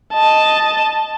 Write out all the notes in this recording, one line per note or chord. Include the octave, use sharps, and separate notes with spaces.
D#5 A5